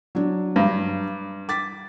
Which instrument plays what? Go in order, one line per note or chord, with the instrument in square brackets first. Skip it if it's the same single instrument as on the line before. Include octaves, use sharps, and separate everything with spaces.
[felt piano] F#3 D4
[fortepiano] G2
[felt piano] D6 A6 B6